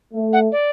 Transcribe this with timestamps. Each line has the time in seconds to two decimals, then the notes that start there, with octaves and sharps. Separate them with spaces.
0.14 A3
0.33 F#5
0.52 D5